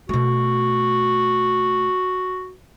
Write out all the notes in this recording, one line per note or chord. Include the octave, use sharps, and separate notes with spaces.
B2 A3 F#4